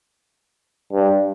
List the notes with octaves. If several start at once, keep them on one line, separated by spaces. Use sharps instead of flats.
G2